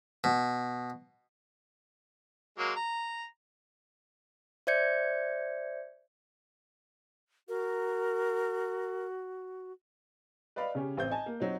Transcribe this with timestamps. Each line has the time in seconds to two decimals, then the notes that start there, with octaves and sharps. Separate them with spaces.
0.24 B2
2.58 F#3 G#3 A#3
2.76 A#5
4.67 C5 D5 E5 G6 G#6 C#7
7.48 F#4 A#4
10.56 B4 D5 D#5 F5 B5
10.75 C#3 C#4 G4
10.97 A1 C4 G6
11.11 D#5 G#5 A5
11.26 A#3
11.40 F#3 C4 D#4